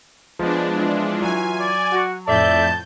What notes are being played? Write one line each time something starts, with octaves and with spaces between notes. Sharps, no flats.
F3 G#3 B3 D4
E3 E4 F4
F#3 G#5
D5
F#4
F2 A2 A4 D5 E5 A5 G6